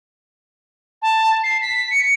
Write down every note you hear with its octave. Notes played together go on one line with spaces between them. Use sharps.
A5
C7
B6
C#7